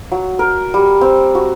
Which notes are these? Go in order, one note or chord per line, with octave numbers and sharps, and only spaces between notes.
F#3
A#4
G3
C4
F#4